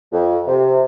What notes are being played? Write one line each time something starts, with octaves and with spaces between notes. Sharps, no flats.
F2
C3